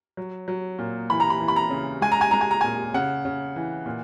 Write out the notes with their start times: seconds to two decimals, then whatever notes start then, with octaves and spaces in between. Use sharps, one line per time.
0.17 F#3
0.48 F#3
0.79 A#2
1.10 E3 B5
1.20 A#5
1.30 B5
1.41 E3
1.48 B5
1.56 A#5
1.70 C#3
2.01 G#3 G#5
2.12 A#5
2.21 G#5
2.31 G#3 A#5
2.41 G#5
2.51 A#5
2.61 A#2 G#5
2.94 C#3 F#5
3.25 C#3
3.56 E3
3.86 A#2